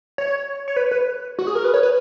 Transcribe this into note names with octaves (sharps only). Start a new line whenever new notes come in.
C#5
C#5
B4
B4
F#4
G#4
A#4
B4
C#5
B4